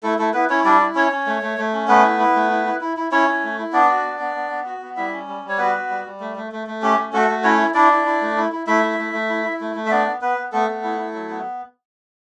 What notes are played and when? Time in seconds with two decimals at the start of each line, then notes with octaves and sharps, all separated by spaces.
0.03 A3 E4 A4
0.19 A3 E4 A4
0.33 B3 E4 B4
0.49 C#4 E4 C#5
0.64 G3 D4 D5
0.80 E4
0.95 C#4 C#5
1.11 C#4
1.26 A3
1.42 A3
1.58 A3
1.73 C#4
1.88 A3 B3 B4
2.04 E4
2.19 E4
2.35 A3
2.50 E4
2.66 E4
2.81 E4
2.97 E4
3.11 C#4 E4 C#5
3.28 E4
3.43 A3
3.59 E4
3.73 B3 D4 D5
3.88 F#4
4.04 B3
4.20 B3
4.35 B3
4.50 B3
4.66 F#4
4.82 B3
4.96 G3 E4 E5
5.12 C#4
5.28 G3
5.43 G3
5.49 C#5
5.58 B3 F#4 B4
5.74 F#4
5.89 G3
6.05 G3
6.20 A3
6.36 A3
6.52 A3
6.67 A3
6.82 C#4 G4
6.97 A3
7.13 A3 F#4 A4
7.28 A3
7.44 C#4 E4 C#5
7.59 E4
7.74 D4 E4 D5
7.91 E4
8.05 E4
8.21 A3
8.37 E4
8.52 E4
8.67 A3 E4 E5
8.83 E4
8.98 A3
9.13 A3
9.29 E4
9.45 E4
9.60 A3
9.75 A3
9.86 E5
9.90 B3 D4 D5
10.06 B3
10.21 B3 B4
10.38 B3
10.52 A3 B3 A4
10.67 B3
10.83 E4
10.99 E4
11.14 F#3
11.30 B3